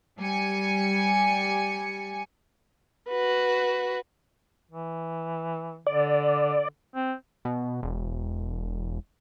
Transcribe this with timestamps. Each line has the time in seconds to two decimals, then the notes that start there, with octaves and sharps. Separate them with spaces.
0.22 G3 G#5 C#7
3.09 F#4 B4
4.71 E3
5.87 D3 D5
6.95 C4
7.45 B2
7.83 E1